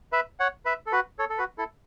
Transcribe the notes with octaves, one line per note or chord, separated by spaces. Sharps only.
B4 E5
C#5 F#5
B4 E5
A4
F#4 B4
A4 C#5
A4
F#4 B4
E4 A4